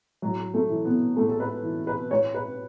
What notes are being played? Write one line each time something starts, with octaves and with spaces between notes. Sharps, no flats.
A2 F#3
A3
E3
B3
A2 A3
A4
B4
E3
B4
A2 C#5
B4